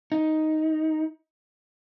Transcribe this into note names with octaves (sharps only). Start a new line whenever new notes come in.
D#4